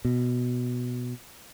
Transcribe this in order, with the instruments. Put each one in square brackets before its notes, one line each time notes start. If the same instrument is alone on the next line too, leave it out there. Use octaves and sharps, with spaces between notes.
[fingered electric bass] B2